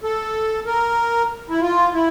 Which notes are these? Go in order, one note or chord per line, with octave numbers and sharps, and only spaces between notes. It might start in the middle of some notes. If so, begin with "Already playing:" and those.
A4
A#4
E4
F4
E4